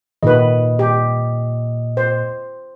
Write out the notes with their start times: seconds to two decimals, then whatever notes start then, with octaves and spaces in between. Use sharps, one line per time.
0.23 A#2 D#3 B4 D#5
0.79 G4
1.97 C5